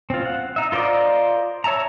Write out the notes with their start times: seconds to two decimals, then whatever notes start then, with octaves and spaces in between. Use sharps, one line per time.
0.10 C4 F4
0.25 F#5
0.56 D#4 E5
0.72 F4 A#4 C5 D5 D#5
1.64 C#5 E5 A5 A#5